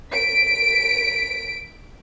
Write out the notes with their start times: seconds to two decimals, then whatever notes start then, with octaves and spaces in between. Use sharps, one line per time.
0.13 B6 D7